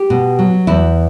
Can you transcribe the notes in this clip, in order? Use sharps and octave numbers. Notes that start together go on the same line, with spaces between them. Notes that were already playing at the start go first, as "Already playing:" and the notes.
Already playing: G4
B2
F#3
E2 E4